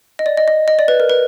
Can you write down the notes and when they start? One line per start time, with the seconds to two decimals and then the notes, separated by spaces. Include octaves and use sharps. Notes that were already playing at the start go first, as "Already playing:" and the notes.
0.19 D#5
0.26 D5
0.37 D#5
0.48 D#5
0.68 D#5
0.79 D5
0.88 B4
1.00 A#4
1.10 B4